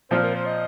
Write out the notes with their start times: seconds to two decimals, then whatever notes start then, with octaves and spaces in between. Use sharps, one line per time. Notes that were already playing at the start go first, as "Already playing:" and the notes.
0.10 A#2 F3 C4 F4 C5
0.23 A#4
0.34 C5
0.46 D#5